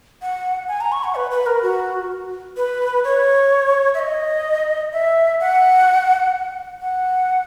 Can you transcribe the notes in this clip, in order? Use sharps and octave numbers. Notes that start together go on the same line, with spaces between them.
F#5
G#5
A#5
C#6
F#5
B4
B4
A#4
F#4
B4
C#5
E5
D#5
E5
F#5
F#5